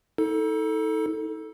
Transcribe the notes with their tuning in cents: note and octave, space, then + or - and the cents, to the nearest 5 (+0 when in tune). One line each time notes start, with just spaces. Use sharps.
D#4 +40 A4 +0